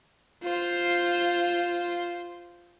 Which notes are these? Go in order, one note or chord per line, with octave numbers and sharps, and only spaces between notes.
F4 C5